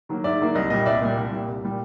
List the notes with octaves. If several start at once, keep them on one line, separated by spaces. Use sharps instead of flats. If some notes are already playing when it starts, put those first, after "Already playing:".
D#3 F#3 A#3
G#2 D5 E5
D#3 F#3 A#3
C2 D#5
A#2 G3 D#5
C2 D5 E5
A#2 G3
C2
A#2 G3
C2
A#2 G3